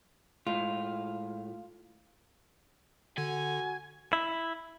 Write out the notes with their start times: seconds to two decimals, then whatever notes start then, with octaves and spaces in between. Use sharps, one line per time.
0.47 A2 G#3 F4
3.18 D3 F#4 G#5
4.13 E4